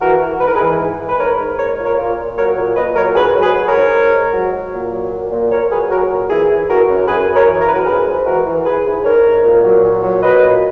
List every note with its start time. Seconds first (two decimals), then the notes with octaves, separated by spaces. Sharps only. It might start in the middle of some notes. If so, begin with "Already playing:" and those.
0.01 E3 F#4 A#4
0.21 E3
0.41 G#2 B4
0.48 A#4
0.55 G#4 B4
0.61 E3
0.81 G#2
1.00 E3
1.09 B4
1.19 G#2 A#4 C#5
1.39 G#2
1.58 A#2 A#4 C#5
1.78 A#2
1.85 A#4 C#5
1.98 A#2
2.18 A#2
2.37 F#3 A#4 C#5
2.57 A#2
2.77 A#2 B4 D#5
2.96 F#3 A#4 C#5
3.16 G#2 G#4 B4
3.35 F#3
3.42 G#4 B4
3.55 F#3
3.68 A#4 C#5
3.75 G#2
3.94 G#2
4.14 G#2
4.33 F#3
4.53 F#3
4.73 A#2
4.93 F#3
5.12 A#2
5.32 A#2
5.51 A#2 A#4 C#5
5.71 F#3 G#4 B4
5.90 F#3 F#4 A#4
6.11 A#2
6.30 E3 E4 G#4
6.50 E3
6.69 F#2 F#4 A#4
6.89 F#2
7.08 F#2 G#4 B4
7.28 F#2
7.35 A#4 C#5
7.47 E3
7.61 A#4
7.67 F#2 B4
7.75 F#4 A#4
7.87 G#2 G#4 B4
8.06 G#2
8.26 E3 F#4 A#4
8.46 E3
8.65 E3 G#4 B4
8.85 G#2
9.05 G#2 A#4 C#5
9.25 G#2
9.44 A#2
9.64 F#3
9.83 A#2
10.03 F#3
10.23 F#3 B4 D#5
10.43 A#2